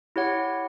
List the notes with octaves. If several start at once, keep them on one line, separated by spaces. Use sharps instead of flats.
E4 G4 C#5 F#5